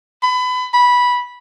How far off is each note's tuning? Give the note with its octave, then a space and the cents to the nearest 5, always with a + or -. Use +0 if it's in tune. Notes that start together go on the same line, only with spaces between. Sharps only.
B5 +25
B5 -10